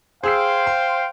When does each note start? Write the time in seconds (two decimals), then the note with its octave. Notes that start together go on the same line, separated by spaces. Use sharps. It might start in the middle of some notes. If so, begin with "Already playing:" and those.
0.24 G#4 C5 F5 G5 E6 C7
0.67 C6